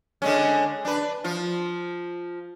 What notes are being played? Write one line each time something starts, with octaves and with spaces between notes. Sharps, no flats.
D3 G#3 C#4
D4 B4
F3 F4